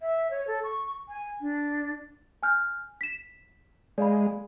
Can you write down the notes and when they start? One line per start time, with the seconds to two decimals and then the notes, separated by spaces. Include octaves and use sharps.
0.01 E5
0.31 C#5
0.48 A4
0.64 C#6
1.09 G#5
1.41 D4
2.43 G#5 F6 G6
3.01 B6 E7
3.98 G#3 D5 F5 B5